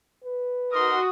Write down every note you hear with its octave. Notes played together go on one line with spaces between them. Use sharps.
B4
D#4 F#4 A#4 C6 D#6